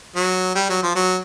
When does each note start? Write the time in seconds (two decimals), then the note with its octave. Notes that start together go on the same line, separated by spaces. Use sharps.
0.16 F#3
0.55 G3
0.69 F#3
0.83 F3
0.95 F#3